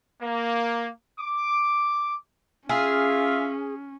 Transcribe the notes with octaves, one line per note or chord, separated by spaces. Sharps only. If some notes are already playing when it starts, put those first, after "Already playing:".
A#3
D6
C#4 F4 G#4 E5 F5